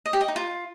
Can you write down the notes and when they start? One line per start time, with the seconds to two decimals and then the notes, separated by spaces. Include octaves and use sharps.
0.06 D#5
0.13 G4
0.21 D#5
0.28 D#4
0.36 F4